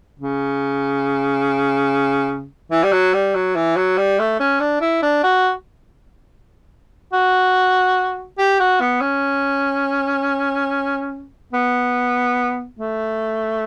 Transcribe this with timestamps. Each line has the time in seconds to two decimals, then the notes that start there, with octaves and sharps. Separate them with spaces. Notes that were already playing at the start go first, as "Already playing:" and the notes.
0.20 C#3
2.71 E3
2.83 G3
2.93 F#3
3.14 G3
3.35 F#3
3.56 E3
3.76 F#3
3.98 G3
4.19 A3
4.40 C#4
4.60 D4
4.81 E4
5.03 D4
5.23 F#4
7.13 F#4
8.39 G4
8.60 F#4
8.81 B3
9.01 C#4
11.53 B3
12.79 A3